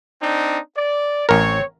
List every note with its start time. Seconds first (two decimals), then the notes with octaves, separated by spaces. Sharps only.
0.21 C4 D4 D#4
0.75 D5
1.29 A1 C4 A#4 C#5